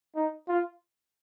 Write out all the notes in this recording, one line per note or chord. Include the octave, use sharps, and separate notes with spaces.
D#4
F4